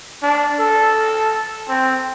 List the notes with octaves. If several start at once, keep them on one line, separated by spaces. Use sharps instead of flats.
D4
A4
C4